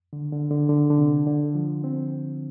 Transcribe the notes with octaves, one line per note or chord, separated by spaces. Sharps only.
D3
D3
D3
D3
D3
C3
D3
F3
C4